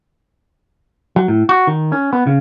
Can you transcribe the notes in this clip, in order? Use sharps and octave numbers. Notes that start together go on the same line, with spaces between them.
F#3
A2
F#4
D#3
C#4
B3
C#3